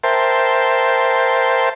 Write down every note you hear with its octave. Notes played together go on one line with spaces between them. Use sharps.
A#4 C5 E5 G5 A5 C6